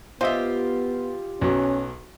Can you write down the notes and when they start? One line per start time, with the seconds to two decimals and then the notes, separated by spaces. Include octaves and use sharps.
0.21 B3 F4 G4 C5 D#5 E5
1.41 B1 F#3 C#4